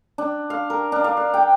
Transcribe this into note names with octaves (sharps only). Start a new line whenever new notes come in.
D4
F5
A#4
D4
F5
F5
G5